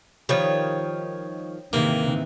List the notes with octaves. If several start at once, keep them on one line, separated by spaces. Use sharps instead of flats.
D#3 F3 G3 C#5
G#2 C3 D#3 E3 A#3